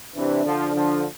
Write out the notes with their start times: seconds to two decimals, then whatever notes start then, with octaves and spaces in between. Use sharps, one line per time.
0.15 C3 E3 D4
0.45 D3 F3
0.73 D3 F3